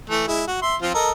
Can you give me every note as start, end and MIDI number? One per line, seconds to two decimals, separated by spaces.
0.10 0.24 52
0.10 0.24 57
0.28 0.44 56
0.28 0.44 64
0.48 0.57 66
0.62 0.76 76
0.62 0.76 84
0.82 0.93 53
0.82 0.93 60
0.82 0.93 65
0.94 1.12 69
0.94 1.12 70
0.94 1.12 75